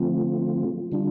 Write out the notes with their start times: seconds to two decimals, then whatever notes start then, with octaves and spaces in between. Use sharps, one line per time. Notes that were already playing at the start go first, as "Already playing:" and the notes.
Already playing: D3 F3 A3 C4 F4
0.92 D3 G3 D4 F4